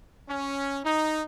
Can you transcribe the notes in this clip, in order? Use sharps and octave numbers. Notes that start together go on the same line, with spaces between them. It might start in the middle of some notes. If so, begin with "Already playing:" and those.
C#4
D#4